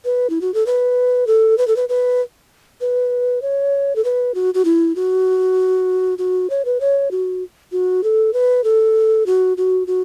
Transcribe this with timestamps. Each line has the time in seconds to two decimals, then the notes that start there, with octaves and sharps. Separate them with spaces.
0.05 B4
0.30 E4
0.41 F#4
0.54 A4
0.66 B4
1.27 A4
1.58 B4
1.68 A4
1.76 B4
1.89 B4
2.81 B4
3.42 C#5
3.96 A4
4.05 B4
4.35 F#4
4.54 F#4
4.65 E4
4.96 F#4
6.18 F#4
6.50 C#5
6.65 B4
6.81 C#5
7.11 F#4
7.72 F#4
8.04 A4
8.33 B4
8.64 A4
9.26 F#4
9.57 F#4
9.87 F#4